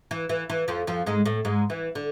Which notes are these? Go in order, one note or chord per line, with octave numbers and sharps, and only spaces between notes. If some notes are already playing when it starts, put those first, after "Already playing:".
E3
E3
E3
F2 F3
F2 F3
G#2 G#3
A2 A3
G#2 G#3
E3
D3